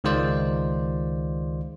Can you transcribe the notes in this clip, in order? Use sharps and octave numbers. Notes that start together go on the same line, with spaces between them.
C#2 D#3 G#3 F4 C5 D5